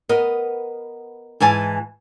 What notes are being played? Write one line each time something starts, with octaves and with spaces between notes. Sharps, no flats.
B3 A#4 D#5
G#2 E3 G#5 A5